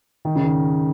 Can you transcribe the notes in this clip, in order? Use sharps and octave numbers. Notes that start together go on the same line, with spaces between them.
D#3
C#3
D#3